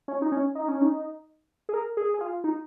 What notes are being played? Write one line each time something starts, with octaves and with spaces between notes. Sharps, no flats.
C#4
D#4
C#4
D#4
C#4
D#4
G#4
A#4
G#4
G#4
F4
D#4